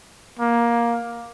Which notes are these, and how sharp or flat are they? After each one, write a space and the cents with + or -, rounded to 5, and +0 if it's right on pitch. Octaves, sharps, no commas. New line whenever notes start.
A#3 +15